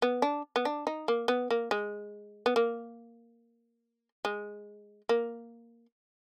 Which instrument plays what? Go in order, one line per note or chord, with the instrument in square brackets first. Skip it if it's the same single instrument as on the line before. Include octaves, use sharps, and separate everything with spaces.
[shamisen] B3
D4
B3
D4
D#4
A#3
B3
A#3
G#3
B3
A#3
G#3
A#3